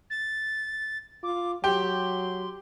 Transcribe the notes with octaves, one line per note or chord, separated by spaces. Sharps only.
A6
F4 D6
F#3 G4 C6